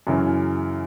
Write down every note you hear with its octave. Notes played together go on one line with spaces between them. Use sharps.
F#2 C#3 E3